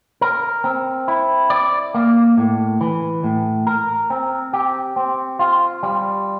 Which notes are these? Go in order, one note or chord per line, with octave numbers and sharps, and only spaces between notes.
A#4
C4
E4
D5
A#3
A2
E3
A2
A#4
C4
G4
C4
F4
G3